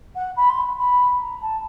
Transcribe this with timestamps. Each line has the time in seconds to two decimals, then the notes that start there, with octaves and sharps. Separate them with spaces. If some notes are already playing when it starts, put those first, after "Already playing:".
0.15 F#5
0.36 B5
0.49 C6
0.78 B5
1.21 A#5
1.41 A5